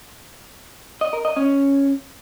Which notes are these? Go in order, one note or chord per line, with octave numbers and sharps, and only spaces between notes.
D#5
A#4
D#5
C#4